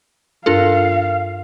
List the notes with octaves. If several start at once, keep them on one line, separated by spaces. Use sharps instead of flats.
G2 D4 F4 A4 A#4 F5 F6